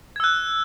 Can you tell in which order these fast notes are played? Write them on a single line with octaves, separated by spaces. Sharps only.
G#6 E6 F#6